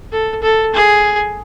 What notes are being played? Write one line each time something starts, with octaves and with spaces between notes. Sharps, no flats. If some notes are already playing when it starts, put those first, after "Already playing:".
A4
A4
G#4